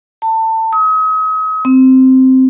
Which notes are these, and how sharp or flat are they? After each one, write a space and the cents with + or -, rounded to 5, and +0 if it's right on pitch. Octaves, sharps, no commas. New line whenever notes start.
A5 +25
D#6 +40
C4 -5